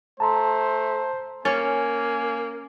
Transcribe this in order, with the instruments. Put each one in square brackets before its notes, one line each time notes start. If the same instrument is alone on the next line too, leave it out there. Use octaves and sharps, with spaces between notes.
[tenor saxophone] A3 [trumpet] C5 [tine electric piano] A5 A#5 C6
[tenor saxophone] A#3 [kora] C#4 C#5 [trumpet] G#5 [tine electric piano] A6